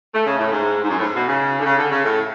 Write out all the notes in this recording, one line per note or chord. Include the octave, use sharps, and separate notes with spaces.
A3
C#3
A2
G#2
G#2
F#2
A2
G#2
B2
C#3
D3
C#3
D3
C#3
A2